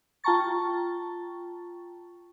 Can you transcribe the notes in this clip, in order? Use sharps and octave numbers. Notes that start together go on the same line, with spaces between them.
F4 G5 A5 A#5 C#6 A6